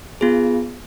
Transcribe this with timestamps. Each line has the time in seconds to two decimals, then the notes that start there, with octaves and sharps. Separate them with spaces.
0.21 B3 F4 G#4